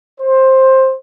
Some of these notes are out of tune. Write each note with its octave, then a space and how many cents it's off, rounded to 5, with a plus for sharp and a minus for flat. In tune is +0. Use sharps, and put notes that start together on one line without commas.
C5 +15